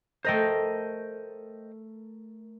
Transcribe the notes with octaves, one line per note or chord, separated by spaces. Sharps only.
A3 A#4 C5 D#5 G5